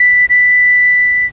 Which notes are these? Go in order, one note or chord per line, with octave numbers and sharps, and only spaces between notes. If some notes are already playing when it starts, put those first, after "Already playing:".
Already playing: B6
B6